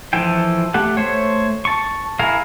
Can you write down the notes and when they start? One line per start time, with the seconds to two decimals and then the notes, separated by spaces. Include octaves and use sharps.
0.13 E3 F3 A4 G5
0.74 A3 G4 A4 F#5
0.97 A3 C5 C#5
1.65 A5 C#6
2.19 E4 G#4 A#4 F5